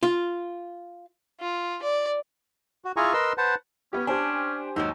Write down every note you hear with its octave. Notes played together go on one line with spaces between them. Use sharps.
F4
F4
D5
F#4
E4 F4 G#4 G#5 A#5 C#6
A#4 B4 D#5 C6 E6
B4 C5 F#5 A5
B3 C#4 G4
C#4 D4 G4 C5 G#5
D#2 G#2 F#3 D#4 E6